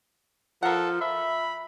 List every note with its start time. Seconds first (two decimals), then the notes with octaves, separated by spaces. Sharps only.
0.63 F3 A4 A#4 F#5
1.01 E5 B5